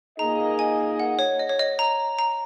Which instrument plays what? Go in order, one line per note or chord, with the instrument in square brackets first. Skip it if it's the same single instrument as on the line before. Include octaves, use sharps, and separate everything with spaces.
[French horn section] A#2 A#3 D#4 G#4 D#5 [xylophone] A#5
[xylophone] G#5
F#5
C#5
D#5
C#5
D#5
A#5
A#5